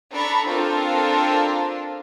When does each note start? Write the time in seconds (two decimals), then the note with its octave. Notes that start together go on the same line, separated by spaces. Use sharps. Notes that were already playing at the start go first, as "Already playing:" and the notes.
0.13 D4 A4 A#5 B5 C#6
0.47 C4 D4 F4 A4 A#4